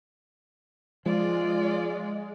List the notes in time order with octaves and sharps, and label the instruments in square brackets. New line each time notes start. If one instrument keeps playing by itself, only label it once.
[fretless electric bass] F3 [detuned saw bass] G#3 [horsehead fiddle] F4 D5